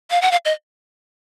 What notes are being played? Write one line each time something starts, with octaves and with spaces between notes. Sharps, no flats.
F5
F#5
F5
D#5